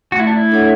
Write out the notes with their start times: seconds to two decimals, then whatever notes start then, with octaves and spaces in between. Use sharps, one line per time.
0.11 A3 F#4
0.20 E4
0.27 D4
0.36 E4
0.51 D4 A4 C#5 F#5